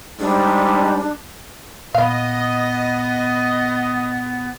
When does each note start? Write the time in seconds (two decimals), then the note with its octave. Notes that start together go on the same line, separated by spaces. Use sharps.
0.20 G#2 G3 D4
1.94 A#2 B3 D#5 F5 B5